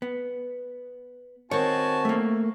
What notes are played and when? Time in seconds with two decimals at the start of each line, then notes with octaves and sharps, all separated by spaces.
0.02 B3
1.51 D#3 C4 F#4 C#5 G#5 A5
2.05 A3 A#3